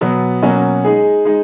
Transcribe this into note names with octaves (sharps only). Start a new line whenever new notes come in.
B2 F#3 B3
B2 F#3 A#3 C#4 F#4
G#3 D#4 G#4
G#3 D#4